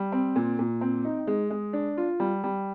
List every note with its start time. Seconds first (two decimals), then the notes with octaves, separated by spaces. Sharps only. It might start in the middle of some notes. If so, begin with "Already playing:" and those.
Already playing: G3
0.12 C4
0.36 A#2
0.59 A#2
0.81 C4
1.05 D#4
1.27 G#3
1.50 G#3
1.73 D4
1.97 F4
2.20 G3
2.44 G3